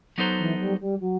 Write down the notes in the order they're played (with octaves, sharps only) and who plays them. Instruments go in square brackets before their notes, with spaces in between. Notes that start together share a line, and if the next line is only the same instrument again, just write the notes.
[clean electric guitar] F#3 B3 D#4 A4 C5
[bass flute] E3
G3
G3
F#3